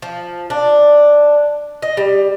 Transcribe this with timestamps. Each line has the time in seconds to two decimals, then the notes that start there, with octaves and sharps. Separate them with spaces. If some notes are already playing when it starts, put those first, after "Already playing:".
0.02 F3
0.50 D4
1.82 D#5
1.97 G3